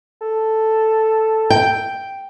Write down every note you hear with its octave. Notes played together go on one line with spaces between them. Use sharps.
A4
G5